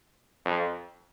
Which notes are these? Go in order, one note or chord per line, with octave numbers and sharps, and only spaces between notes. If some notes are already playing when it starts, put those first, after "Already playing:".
F2